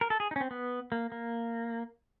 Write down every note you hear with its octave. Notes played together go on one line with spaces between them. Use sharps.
A#4
A4
G#4
D#4
C#4
C4
B3
A#3
A#3